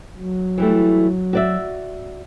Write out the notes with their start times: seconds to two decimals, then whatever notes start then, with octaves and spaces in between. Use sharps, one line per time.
0.17 F#3
0.58 E3 G3 A3
1.33 F#4 D5 E5